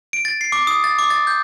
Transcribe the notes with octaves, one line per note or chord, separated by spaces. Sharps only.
D7
A6
C7
D6
D#6
A6
D6
A6
G6